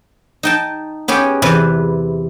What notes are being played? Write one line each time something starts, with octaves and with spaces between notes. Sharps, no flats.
D#4 G5 A5
B3 C#4 G4 G#4
E2 C3 B4